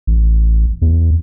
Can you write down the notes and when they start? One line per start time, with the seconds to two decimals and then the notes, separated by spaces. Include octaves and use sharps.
0.07 A1
0.82 E2